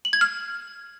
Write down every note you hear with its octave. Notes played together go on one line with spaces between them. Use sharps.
F#7
G#6
F6